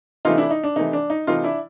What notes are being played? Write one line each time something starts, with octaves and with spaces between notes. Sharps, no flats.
C3 E3 A3 D#4 F4
D4 E4
D#4
D4
C3 E3 A3 D#4
D4
D#4
C3 E3 A3 D#4 F4
D4 E4